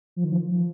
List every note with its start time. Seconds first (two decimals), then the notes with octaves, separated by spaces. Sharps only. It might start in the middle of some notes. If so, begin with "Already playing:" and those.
0.16 F3
0.24 D#3
0.32 F3
0.47 F3